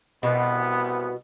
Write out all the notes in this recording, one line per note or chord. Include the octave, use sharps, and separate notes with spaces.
C2 B2 B3